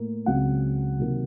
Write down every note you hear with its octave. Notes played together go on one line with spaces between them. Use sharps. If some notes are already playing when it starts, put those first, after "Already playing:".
Already playing: A2 A#3
C#2 C#3 F#3 C4 F#5
C3 D#3 F#3 A#3